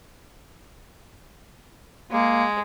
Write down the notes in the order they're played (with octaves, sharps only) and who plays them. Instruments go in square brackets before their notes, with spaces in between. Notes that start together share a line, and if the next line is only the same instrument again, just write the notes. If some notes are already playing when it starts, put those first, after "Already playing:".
[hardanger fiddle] G#3 [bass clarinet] A#3